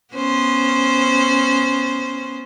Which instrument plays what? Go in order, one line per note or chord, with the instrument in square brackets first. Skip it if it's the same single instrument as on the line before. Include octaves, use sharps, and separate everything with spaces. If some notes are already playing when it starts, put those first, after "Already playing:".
[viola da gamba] B3 C#4 C5